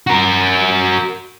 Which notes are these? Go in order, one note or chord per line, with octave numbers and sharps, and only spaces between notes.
F#4 A#4